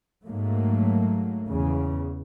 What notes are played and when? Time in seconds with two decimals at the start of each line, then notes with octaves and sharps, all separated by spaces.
0.24 G#2 F#3 A3 A#3
1.49 E2 C#3